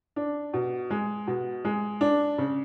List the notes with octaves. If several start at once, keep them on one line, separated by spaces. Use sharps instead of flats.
D4
B2
G#3
B2
G#3
D4
C#3